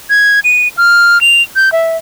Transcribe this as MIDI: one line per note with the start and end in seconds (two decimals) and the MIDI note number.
0.10 0.40 92
0.44 0.68 99
0.78 1.21 89
1.21 1.42 101
1.56 1.72 91
1.72 1.97 76